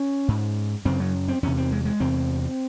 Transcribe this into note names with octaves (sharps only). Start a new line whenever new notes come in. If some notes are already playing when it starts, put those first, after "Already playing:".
Already playing: C#4
G#2
F#2 C#3 C4
F#3
C4
E2 C3 C#4
C4
G#3
G#3
E2 C3 C4